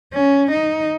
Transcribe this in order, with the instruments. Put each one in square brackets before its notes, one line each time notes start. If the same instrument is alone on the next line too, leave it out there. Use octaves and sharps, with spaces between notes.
[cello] C#4
D#4